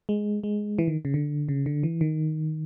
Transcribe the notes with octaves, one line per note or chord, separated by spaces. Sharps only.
G#3
G#3
E3
D#3
C#3
D3
C#3
D3
E3
D#3